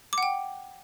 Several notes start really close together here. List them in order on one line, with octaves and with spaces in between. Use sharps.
D6 F#5 G5